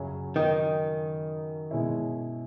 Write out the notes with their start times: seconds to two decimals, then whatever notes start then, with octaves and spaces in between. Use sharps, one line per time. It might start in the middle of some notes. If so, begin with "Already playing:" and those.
Already playing: F#2 C#3 F#3 C#4
0.36 D#3
1.71 B2 G#3 C#4 E4